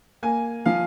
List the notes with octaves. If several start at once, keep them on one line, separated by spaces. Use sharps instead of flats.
A#3 G#5
F3 F5